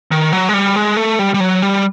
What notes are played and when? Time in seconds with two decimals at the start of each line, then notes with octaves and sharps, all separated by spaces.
0.11 D#3
0.32 F#3
0.49 G#3
0.54 G3
0.76 G#3
0.96 A3
1.19 G3
1.34 G3
1.40 F#3
1.62 G3